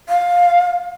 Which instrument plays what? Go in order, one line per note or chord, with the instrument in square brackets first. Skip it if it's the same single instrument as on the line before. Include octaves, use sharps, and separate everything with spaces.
[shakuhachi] F5